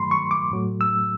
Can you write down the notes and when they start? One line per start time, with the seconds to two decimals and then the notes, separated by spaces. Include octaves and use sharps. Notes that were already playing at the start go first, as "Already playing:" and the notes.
Already playing: G2 D#3 F#3 A3 B5 C6
0.11 C#6
0.31 D6
0.51 A2 F#3 A3
0.81 E6